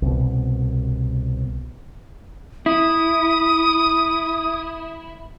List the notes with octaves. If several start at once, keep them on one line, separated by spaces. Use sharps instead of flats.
C2 B2
E4 D#6